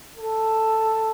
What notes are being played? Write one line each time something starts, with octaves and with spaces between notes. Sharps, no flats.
A4